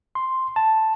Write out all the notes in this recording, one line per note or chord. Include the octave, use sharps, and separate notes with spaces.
C6
A5